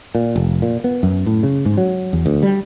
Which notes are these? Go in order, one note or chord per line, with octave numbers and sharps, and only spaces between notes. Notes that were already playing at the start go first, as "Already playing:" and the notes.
A#2
F1
A#2
B3
F#2
A2
C#3
G#2
F#3
E2
D2
G3